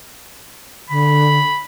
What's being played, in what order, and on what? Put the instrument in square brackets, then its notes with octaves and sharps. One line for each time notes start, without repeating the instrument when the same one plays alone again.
[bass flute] D3 [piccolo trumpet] B5